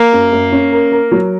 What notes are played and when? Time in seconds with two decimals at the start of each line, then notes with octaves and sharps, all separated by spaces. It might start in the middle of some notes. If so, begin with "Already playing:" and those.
Already playing: A#3
0.13 F#2
0.33 F#2
0.52 C#4
0.72 A#4
0.92 A#4
1.11 F#3